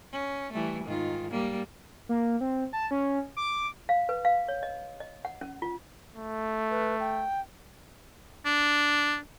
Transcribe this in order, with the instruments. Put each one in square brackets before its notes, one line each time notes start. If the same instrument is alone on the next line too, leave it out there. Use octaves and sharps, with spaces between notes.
[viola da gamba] C#4
E3 G3 A3
G#2 D#3 F4
G3 A#3
[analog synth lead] A#3
C4
A5
C#4
D6
[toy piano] F5
B4
F5
C#5
D#5
D#5
F#5
C#4
F4
[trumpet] A3
[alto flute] B4
G5
[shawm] D4